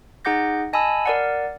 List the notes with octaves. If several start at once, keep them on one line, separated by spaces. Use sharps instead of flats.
D#4 G#4 F#5 D6 G6 A#6
D#5 G#5 A5 B5 E6
A#4 D5 F#5